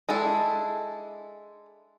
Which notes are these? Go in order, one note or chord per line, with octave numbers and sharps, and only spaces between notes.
G#3 D4 E4 A4